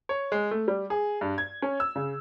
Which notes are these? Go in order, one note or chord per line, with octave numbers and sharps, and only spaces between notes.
C#5
G#3
A3
G3
G#4
G2
G#6
C#4
E6
C#3